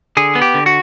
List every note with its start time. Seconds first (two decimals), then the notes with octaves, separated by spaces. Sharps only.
0.17 D3 G#4
0.35 B3
0.42 G4
0.54 D3
0.66 F#4